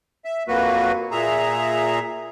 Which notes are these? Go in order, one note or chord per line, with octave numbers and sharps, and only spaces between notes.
E5
F2 F#3 A#3 F#4 B4
A#2 G#4 E5 A#5